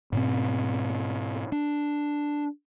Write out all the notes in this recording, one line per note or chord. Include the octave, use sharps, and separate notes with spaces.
G#2 B2 C4
D4